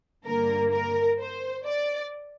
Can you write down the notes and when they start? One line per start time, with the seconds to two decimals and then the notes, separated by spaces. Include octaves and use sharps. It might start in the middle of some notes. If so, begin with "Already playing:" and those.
0.25 G2 D3 A#3 A#4
0.72 A#4
1.19 C5
1.66 D5